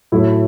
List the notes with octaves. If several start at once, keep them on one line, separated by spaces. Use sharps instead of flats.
A2 F#3 A3 E4